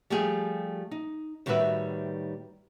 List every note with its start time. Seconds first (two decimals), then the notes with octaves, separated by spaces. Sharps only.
0.10 F3 G3 A3 G4 G#4
0.91 D#4
1.46 A2 D#3 G3 F#4 B4 E5